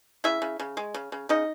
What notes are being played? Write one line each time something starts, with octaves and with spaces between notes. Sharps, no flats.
C#3 E4 E5
C#3
C#3
G#3
C#3
C#3
C#3 D#4 D#5